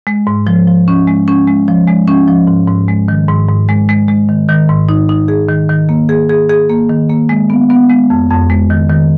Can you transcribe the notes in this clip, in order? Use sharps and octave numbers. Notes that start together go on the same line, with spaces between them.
G#3
G#2
F3
F3
C#4
G#3
C#4
G#3
F3
G#3
C#4
F3
G#2
G#2
G#3
D#3
G#2
G#2
G#3
G#3
G#3
D#3
D#3
G#2
D#4
D#4
G#4
D#3
D#3
A#3
G#4
G#4
G#4
A#3
D#3
A#3
G#3
B3
B3
G#3
F2
F2
G#3
D#3
D#3